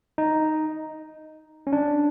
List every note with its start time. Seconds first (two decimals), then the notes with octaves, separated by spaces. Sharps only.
0.18 D#4
1.67 C#4
1.73 D4